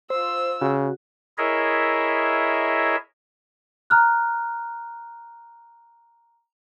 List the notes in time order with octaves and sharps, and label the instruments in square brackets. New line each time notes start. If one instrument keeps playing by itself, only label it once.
[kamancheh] F4 E6 [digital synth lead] C5
[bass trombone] C#3 [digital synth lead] F#4
[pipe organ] E4 G#4 A#4 C#5 D#5 E5
[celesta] A#5 F6 F#6